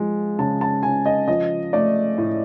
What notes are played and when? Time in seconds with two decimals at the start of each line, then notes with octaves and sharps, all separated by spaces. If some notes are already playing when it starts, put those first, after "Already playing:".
Already playing: F3 G#3
0.39 C#3 A5
0.61 A5
0.83 C#3 G#5
1.06 D#5
1.28 F3 D#5
1.73 A3 D5
2.18 A2